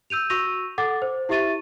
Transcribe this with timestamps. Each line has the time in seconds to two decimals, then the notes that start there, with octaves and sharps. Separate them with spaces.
0.10 E6 G6 D#7 F7
0.30 F#4 C#6 E6 A#6 D#7 F7
0.78 A4 F#5 D6 A6
1.02 C5
1.29 E4 G4 E5 C#6 A6 D#7